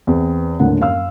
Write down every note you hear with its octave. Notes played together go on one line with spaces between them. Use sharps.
E2 B3 C4
D#1 A2 D3 A#4 F#5
F#2 F5 E6